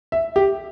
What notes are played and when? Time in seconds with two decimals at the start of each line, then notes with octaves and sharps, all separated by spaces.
0.12 E5
0.36 G4